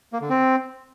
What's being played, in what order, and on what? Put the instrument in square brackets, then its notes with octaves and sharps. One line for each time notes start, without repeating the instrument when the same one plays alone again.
[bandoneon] A#3
D3
C4